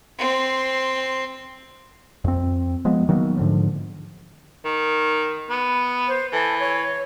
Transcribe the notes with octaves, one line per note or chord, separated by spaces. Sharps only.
C4 C6
F2 C4
F3 G#3 B3
D#3 F#3 A#3 B3
G#2 D3 F3
D#3
B3
C5
E3 A4
C#5